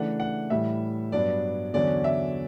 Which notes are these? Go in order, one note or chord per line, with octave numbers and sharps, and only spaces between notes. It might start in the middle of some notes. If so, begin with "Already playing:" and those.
Already playing: C#3 E3 A3 D4 F#5
F#5
A2 E3 G3 E5
G2 F#3 B3 D4 D5
E2 D3 F#3 C#4 D5
E5